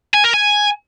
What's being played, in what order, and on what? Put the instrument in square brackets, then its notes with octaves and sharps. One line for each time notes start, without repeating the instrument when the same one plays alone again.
[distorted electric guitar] G#5
A#4
G#5